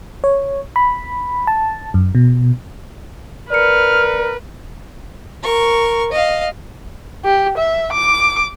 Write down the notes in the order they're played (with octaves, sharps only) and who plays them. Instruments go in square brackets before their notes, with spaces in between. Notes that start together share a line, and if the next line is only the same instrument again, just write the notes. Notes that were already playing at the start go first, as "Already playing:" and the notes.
[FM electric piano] C#5
B5
A5
F#2
B2
[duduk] A#4 [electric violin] B4 [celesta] D5 C#7 [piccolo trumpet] F6
[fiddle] A#4 C#6
D#5 F5
[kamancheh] G4
E5
D6